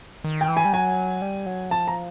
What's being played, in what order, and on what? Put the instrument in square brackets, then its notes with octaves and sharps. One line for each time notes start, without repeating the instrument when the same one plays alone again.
[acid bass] D#3
[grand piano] G5
[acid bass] E3
[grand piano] G#5
[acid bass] G3
[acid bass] F#3 [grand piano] G#5
[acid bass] G3
F#3
[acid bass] F3 [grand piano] A5
[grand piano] A#5